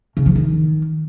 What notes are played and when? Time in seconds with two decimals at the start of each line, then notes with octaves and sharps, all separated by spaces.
0.17 C#3
0.26 F3
0.35 D#3